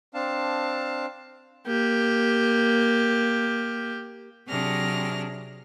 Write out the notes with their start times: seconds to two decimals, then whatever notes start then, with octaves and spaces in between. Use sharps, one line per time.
0.14 C4 D4 F5 A5
1.67 A#3 G4
4.47 C3 F#3 D4 G#4 F6 A#6